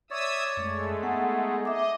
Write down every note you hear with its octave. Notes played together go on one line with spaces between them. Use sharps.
C#5 D5 E5 D#6 E6
F#2 G#3 A3
B3 D#4 G#4 F#5
D#5 E5 D6